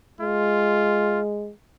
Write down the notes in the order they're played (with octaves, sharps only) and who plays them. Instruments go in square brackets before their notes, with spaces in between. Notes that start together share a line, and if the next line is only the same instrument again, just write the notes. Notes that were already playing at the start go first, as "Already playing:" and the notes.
[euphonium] G#3 [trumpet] F4